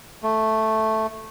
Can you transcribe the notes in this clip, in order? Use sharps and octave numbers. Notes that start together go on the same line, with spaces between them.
A3